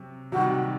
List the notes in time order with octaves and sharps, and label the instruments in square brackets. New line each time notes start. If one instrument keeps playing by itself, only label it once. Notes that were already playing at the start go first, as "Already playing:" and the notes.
Already playing: [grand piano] C3 F#3
[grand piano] C3 D#3 G3 [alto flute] F#4